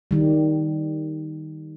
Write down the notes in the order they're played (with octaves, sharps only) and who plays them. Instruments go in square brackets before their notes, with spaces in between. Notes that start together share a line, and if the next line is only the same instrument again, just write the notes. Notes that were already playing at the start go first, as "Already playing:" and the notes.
[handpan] D#3 G3